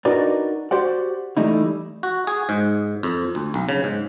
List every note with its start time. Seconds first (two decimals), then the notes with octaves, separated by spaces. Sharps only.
0.05 D4 D#4 F#4 A#4 B4 D5
0.71 F#4 G4 C5 D5 F#5
1.37 E3 G3 A3 D#4 E4
2.03 F#4
2.27 G#4
2.49 G#2
3.03 F2
3.35 D2
3.54 B1
3.69 C#3
3.84 G#2